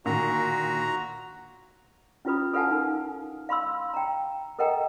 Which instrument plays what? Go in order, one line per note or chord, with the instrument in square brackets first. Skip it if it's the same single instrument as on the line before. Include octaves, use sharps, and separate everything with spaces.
[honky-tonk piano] A#2 D3 D#3 [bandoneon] F#4 A#5
[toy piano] C#4 E4 F4 B4 B5 D#6
A4 B4 F5 F#5 G#5 A5
D#4 A#4
F5 B5 C6 E6
G5 A#5
A4 A#4 D#5 F#5 G5 A#5